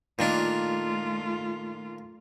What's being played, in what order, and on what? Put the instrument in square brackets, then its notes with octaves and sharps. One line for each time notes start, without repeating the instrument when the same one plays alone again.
[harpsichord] A#2 D#3 D4 [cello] A3 F4